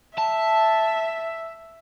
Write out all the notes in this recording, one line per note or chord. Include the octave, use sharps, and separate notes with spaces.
E5 A5